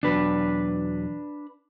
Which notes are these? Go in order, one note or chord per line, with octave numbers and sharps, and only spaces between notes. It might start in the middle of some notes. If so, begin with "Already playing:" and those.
E2 B2 F#3 D4 B4